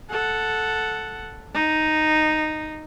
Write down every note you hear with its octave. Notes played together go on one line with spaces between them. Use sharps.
A4 F#5
D#4